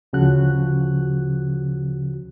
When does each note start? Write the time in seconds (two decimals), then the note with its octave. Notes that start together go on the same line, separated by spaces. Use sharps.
0.13 D2 C#3 F3 F#4 F#6